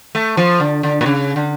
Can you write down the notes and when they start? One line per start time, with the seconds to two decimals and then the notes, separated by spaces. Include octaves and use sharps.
0.15 A3
0.37 F3
0.60 D3
0.83 D3
1.01 A#2
1.06 C#3
1.36 D3